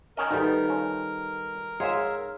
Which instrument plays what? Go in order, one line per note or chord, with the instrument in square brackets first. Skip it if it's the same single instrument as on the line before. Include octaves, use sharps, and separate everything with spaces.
[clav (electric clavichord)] D#3 C#4 D#5 [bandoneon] A#4
[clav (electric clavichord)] D2 [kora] D#3 G3 [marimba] D#4 A4 B4
[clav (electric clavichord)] F3 C#4
[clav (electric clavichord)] G#2 [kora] G#4 E5 [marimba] C#5 F5 C6